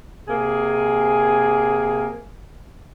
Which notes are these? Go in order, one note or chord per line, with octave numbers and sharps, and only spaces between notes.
C3 A#3 G#4